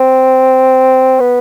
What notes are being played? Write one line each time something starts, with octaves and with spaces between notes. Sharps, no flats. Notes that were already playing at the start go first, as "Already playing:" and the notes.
Already playing: C4
B3